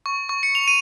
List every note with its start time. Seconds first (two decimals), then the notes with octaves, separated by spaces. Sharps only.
0.06 C#6
0.29 C#6
0.43 C#7
0.55 F7
0.68 D#7